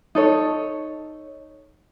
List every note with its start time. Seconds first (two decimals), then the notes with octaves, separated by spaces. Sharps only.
0.15 D#4 A4 C#5